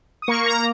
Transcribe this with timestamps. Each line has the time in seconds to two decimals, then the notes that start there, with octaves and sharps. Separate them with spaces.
0.22 D#6
0.28 A#3 C#6
0.46 A#5